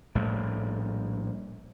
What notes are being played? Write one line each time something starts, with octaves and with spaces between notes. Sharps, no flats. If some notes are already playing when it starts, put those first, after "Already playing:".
A#1 A2 G3